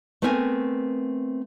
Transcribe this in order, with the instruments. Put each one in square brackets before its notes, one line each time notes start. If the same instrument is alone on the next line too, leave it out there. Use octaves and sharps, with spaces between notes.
[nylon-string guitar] A3 B3 C4 A#4 E5 G#5